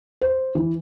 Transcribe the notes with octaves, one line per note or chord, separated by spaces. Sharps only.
C5
E3